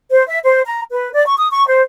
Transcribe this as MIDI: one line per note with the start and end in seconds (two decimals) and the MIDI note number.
0.11 0.24 72
0.27 0.39 76
0.45 0.60 72
0.65 0.82 82
0.91 1.10 71
1.14 1.25 74
1.26 1.36 85
1.38 1.48 87
1.51 1.67 85
1.68 1.81 72